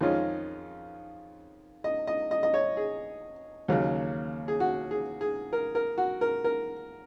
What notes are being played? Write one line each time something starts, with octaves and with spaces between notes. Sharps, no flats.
F2 D#3 G#3 C#4 F4
D#5
D#5
D#5
D#5
C#5
G#4
D#2 C#3 F#3
G#4
F#4
G#4
G#4
A#4
A#4
F#4
A#4
A#4